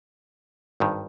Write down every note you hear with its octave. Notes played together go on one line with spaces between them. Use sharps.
G#1 G2 D#3